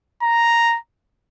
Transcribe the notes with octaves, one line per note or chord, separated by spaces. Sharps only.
A#5